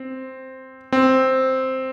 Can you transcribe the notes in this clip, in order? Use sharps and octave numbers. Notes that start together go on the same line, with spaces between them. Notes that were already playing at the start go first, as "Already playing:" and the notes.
Already playing: C4
C4